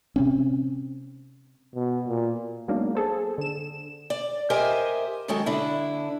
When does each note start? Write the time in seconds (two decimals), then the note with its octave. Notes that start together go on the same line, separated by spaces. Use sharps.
0.16 C3 C4 C#4
1.75 B2
2.07 A#2
2.68 F#3 G#3 A#3 B3 D4 D#4
2.95 G#4 A4 C5
3.38 D3 E7
4.10 D5
4.50 G4 A#4 C5 D#5 E5 G#5
5.28 D#3 F#3 G#3 F#4 G4 A4
5.46 D3 D4 E4